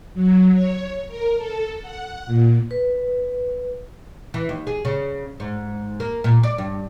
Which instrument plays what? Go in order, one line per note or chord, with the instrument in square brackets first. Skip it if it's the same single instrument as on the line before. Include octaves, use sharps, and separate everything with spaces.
[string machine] F#3
C#5
A#4
A4
F#5
A#2
[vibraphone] B4
[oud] E3
D#2
G#4
C#3
G#2
A#3
A#2
D5
G2